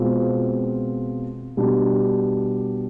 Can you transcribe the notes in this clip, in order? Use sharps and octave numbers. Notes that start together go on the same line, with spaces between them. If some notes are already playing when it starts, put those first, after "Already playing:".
Already playing: B2 G#3 C4 F4
B2 G3 D4